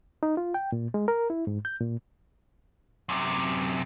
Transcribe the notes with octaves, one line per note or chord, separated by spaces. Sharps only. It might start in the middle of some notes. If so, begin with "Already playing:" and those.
D#4
F4
G5
A#2
G#3
A#4
E4
G#2
G6
A#2
F#2 C3